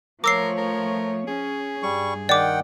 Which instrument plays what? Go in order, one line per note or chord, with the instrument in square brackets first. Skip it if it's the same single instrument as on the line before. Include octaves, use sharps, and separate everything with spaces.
[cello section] F3 A3 C#5 [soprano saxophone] A#4 [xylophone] D6 E6 C7
[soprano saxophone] A#4
[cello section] C#4 [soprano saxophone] G#4
[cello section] G2 [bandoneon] G3 C#6
[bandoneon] D#3 F#5 G5 [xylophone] D5 D6